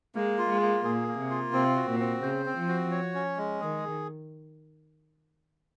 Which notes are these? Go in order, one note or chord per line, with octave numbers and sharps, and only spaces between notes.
G#3 A#3
F4
G#3
A#3
A#2 G#4
A#3
C3
F4
C3 C4
F#4
A#2
C4
C#3 C5
C4
F3
F#4
C#5
C#4
G#3
D#3 G#4